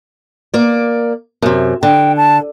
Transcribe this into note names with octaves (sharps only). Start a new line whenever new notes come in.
A#3 D5
F#2 C3
D3 G5
A5